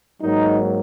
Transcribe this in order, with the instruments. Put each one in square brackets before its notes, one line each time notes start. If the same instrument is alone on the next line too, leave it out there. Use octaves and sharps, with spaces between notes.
[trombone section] G#2 F#3 A#3 D#4